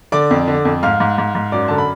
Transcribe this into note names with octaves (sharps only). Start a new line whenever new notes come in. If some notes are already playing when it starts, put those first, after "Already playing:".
D3 D5 D6
F2
D3
F2
G#2 F5 F6
G#2
G#2
G#2
F#2 D5 D6
D3 A5
B5